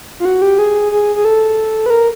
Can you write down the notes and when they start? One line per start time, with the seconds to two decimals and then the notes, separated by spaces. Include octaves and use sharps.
0.20 F4
0.25 F#4
0.42 G4
0.59 G#4
0.92 G#4
1.16 G#4
1.25 A4
1.86 B4
1.90 A#4